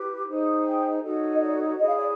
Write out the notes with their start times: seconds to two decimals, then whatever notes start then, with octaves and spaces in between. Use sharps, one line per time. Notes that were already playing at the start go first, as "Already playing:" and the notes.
Already playing: E4 G4 B4
0.27 D#4 G#4 C5
0.64 G5
1.02 D#4 F#4 A4 C#5
1.34 D#5
1.40 D5
1.78 E4 G#4 C#5 D#5
1.88 F5
1.97 D5